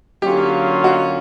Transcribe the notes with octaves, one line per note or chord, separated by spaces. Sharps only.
D3 F#3 A#3 C#4 F4 G4
F#4